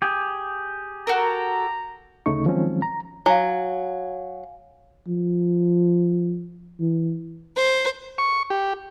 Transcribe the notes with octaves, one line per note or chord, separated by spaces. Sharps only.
G4 G#4
F#4 A4 A#4 A#5
D2 C#3 A3 D#4 C#6
D#3 F3 F#3 G#3 C4 C#4
A#5
F#3 F5 G#5
F3
E3
C5
C#6
G4